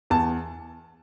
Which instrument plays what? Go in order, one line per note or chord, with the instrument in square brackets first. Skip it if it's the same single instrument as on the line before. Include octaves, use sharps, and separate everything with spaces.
[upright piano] E2 A5